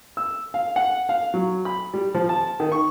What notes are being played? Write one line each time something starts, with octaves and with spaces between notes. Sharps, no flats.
E6
F5
F#5
F5
F#3
B5
G3
F3
A5
D#3
C#6